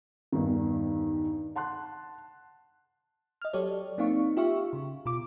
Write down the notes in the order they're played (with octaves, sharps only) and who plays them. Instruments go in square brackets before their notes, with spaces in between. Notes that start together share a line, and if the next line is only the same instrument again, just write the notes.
[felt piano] E2 G2 D#3
F#5 A5 C6 F#6
[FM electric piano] D#5 F6
F#3 G4 A4 C#5 D5
A#3 C4 D#4 F5 C#6
F4 G4 E5 F5 C#6
C#3
B2 F4 D6